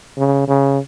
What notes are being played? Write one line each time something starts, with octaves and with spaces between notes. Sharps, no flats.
C#3
C#3